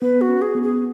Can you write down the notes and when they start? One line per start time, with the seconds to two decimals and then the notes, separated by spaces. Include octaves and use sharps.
0.02 B3 B4
0.21 F#4
0.29 C#4
0.42 G#4
0.55 B3
0.62 G#4